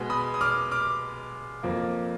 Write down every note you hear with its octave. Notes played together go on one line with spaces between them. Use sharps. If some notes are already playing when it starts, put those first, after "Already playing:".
Already playing: B2 G#3 B3
B5 D#6
D#6
D6 F6
D6 F6
F2 F3 A#3